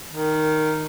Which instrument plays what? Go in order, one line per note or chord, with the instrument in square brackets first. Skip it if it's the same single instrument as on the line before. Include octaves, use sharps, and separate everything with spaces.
[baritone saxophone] D#3